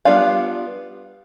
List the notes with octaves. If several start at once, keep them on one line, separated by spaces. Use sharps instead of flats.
G3 B3 D4 F4 F5